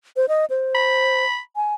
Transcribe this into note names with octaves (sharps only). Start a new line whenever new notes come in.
C5
D#5
C5
B5
G#5